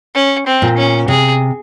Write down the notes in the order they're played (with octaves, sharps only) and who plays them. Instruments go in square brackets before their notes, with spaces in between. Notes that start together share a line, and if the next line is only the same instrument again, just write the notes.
[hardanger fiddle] C#4
C4
[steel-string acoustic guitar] A#2
[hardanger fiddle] C#4
[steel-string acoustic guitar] C3 [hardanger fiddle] G#4